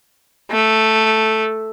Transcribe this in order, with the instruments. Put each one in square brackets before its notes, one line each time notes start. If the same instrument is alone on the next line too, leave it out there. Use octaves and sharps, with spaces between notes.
[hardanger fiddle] A3